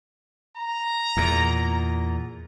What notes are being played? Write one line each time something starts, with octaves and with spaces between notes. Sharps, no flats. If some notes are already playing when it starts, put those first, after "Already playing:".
A#5
E2 A#2